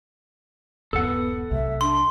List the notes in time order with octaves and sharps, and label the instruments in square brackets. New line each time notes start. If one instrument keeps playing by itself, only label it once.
[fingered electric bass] D#1 G2 E3 [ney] B3 [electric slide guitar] A4 F#5
[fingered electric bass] B1 C3 A3 [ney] E5
[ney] D4 [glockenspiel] C6